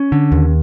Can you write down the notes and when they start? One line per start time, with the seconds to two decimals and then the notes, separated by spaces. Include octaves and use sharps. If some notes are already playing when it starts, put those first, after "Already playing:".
Already playing: C#4
0.12 D3
0.32 D#2